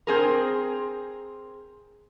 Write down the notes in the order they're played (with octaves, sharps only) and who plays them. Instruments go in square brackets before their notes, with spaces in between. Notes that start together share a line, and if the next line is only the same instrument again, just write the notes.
[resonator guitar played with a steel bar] C4 G#4 A#4